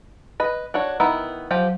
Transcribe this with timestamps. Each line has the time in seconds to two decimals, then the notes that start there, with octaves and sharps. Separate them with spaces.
0.40 B4 D#5
0.74 D4 F#4 C#5
1.00 D#3 B3 E4 A#5
1.51 F3 F#3 G4